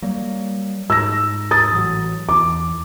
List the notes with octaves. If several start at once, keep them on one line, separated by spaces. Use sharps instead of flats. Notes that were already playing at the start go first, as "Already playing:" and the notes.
F#3 G3 A#3
G#2 E6 A#6
D#6 A6
A1 F#3
E2 D6